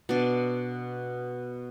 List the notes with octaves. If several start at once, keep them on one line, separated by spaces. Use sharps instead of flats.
B2 D4